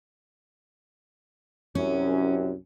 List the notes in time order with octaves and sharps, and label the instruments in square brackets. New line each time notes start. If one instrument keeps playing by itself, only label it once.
[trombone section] C2 F#2 [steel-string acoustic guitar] C#4